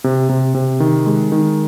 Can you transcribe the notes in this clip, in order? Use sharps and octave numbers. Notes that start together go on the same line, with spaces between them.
C3
C3
C3
D#3
G#3
D#3